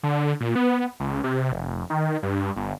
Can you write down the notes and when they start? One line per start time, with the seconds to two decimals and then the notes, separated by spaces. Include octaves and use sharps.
0.03 D3
0.40 A#2
0.55 B3
1.00 C#2
1.24 C3
1.52 F1
1.90 D#3
2.23 G2
2.56 G1